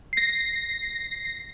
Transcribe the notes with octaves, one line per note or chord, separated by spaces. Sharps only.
A#6 C7